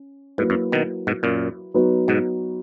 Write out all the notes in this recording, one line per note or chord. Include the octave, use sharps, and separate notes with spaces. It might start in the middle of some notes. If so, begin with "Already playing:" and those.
Already playing: C#4
G#2 F#3 A#3 E4 B4
F#2
B2 D#3
G#2 B2
F#2 A#2
F#3 B3 D#4 F#4 B4
G#2 B2